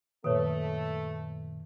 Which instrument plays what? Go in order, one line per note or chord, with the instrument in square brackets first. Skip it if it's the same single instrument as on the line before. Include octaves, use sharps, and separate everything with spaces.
[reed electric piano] F#2 A#2 D#3 [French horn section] A3 [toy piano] A4 B4 C#5